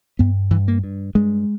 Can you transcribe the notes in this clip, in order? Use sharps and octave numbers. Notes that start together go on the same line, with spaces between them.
G2 B3
G2 E3
A#3
G2
G2 G#3